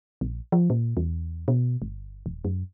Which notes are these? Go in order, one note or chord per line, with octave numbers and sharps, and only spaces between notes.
A#1
F3
A#2
E2
B2
G1
D#1
F#2